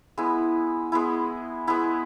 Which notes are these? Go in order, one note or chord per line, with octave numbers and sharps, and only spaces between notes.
G#3 B3 E4
G#3 B3 E4
G#3 B3 E4